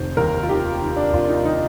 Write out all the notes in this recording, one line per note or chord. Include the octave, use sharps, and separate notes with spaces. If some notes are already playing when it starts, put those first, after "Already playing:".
Already playing: F1 D#3 C5
D#2 A#4
F4
D#3 G4
D#3
D4
F1 F4
D#4
D#3 D#4